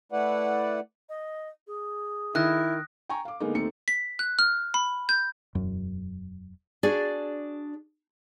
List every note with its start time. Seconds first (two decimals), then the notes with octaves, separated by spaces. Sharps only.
0.12 A3 E4 B4 D5 F#5
1.09 D#5
1.67 G#4
2.35 D#3 E4 D#6 F#6 A#6
3.09 G5 G#5 A#5 C#6
3.25 F5 D6
3.40 D3 G#3 A#3 B3 D#4
3.55 D#2 A3 C4 D#4 A4 C#7
3.88 B6
4.19 F#6
4.39 F6
4.74 B5
5.09 G6
5.55 E1 F#2
6.83 D4 F#4 G#4 D5